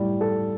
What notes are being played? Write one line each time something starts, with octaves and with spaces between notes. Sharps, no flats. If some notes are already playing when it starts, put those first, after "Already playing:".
Already playing: A2 G3
A4